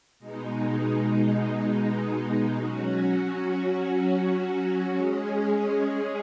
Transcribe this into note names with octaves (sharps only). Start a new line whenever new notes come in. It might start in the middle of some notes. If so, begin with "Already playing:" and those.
B2 G#3 D#4
F#3 C#4 F#4
G#3 C#4 G#4